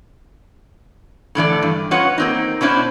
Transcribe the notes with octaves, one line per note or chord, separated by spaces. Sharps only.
A2 D3 E3 D5
G2
C#4 F4 B4 C#5 D#5 F#5
A#3 C4 D#4
B2 C#4 D4 E4 C5